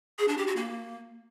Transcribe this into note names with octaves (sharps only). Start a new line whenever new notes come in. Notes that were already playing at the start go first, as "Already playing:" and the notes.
G#4
D4
G4
F#4
A#3